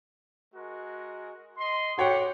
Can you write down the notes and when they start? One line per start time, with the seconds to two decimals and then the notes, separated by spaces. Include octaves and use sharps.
0.54 G#3 F#4 A#4
1.57 D#5 C6
1.98 F#4 G4 A4 C#5 F#5 G5